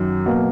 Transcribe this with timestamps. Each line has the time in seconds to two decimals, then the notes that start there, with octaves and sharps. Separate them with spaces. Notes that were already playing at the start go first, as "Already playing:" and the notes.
Already playing: F#2 D#3
0.26 B2 F#3 A#3